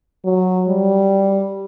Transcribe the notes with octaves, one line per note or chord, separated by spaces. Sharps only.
F#3
G3